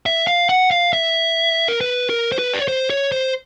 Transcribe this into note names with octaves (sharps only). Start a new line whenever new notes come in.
E5
F5
F#5
F5
E5
A#4
B4
A#4
C5
B4
D5
C#5
C5
C#5
C5